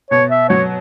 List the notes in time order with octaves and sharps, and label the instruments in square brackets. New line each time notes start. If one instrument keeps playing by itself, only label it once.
[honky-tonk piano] B2 [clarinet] C#5
[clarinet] E5
[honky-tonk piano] F#3 [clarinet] C#5